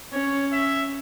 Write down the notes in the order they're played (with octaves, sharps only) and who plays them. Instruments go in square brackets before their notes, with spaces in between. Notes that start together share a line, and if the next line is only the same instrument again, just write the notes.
[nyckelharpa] C#4 [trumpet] C#5
[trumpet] E5